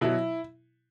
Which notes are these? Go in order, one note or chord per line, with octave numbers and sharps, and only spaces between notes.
B2 F#3 E4